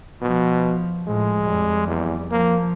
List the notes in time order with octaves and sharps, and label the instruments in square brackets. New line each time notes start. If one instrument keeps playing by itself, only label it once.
[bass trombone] B2 [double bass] F3
[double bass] A2 F3 [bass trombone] G#3
[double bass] F2 G3
[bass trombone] E2
[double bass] F3 [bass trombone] A#3